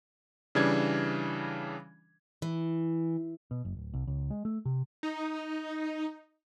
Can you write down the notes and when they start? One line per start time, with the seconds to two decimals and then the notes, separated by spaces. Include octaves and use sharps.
0.55 C#3 E3 G3 D4 G#6
2.42 E3
3.51 B2
3.65 F#1
3.77 D1
3.94 C2
4.07 C#2
4.30 G#3
4.45 A3
4.65 C3
5.03 D#4